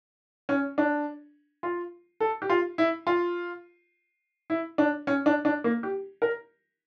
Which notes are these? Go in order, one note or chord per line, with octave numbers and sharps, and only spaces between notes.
C#4
D4
F4
A4
G4
F4
E4
F4
E4
D4
C#4
D4
D4
A#3
G4
A#4